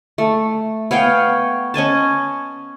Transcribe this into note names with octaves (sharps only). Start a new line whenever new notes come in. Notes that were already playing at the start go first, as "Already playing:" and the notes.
A3
B3 C#5 F5 G5
C#4 D#5 G#5 A5